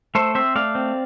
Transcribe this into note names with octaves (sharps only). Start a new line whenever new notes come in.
A3 A4 C5
C4 C5 E5
A3 D5 F5
C4